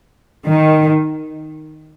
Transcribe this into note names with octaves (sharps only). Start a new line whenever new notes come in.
D#3